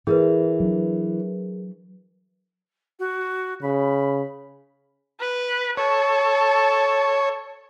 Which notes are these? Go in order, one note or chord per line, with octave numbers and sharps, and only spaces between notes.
E3 G#4 A#4 B4
F#3 D4
F#4
C#3 B5
B4
A4 C#5